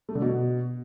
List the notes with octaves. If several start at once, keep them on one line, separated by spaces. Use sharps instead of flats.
A3
D3
B2